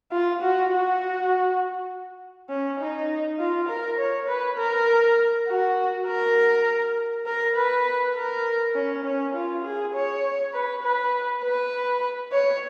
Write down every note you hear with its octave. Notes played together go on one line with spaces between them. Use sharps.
F4
F#4
F#4
C#4
D#4
F4
A#4
C#5
B4
A#4
F#4
A#4
A#4
B4
A#4
C#4
C#4
F4
G#4
C#5
B4
B4
B4
C#5